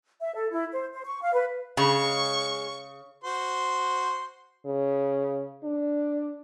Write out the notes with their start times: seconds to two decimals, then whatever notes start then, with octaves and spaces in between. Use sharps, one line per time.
0.21 E5
0.35 A4
0.51 E4
0.72 C5
0.93 C5
1.06 C#6
1.22 F5
1.34 B4
1.77 C#3 G#3 C#6
3.24 F#4 C5 C6
4.66 C#3
5.64 D4